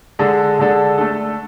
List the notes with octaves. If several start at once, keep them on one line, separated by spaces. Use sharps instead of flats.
D3 G#3 D4 A4
D3 G#3 D4 A4
A3 D4 A4